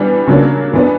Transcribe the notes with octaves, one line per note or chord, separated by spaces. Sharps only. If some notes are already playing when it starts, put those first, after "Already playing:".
Already playing: E3 G3 B3 D4
C#3 F#3 A#3 D4
E3 B3 D4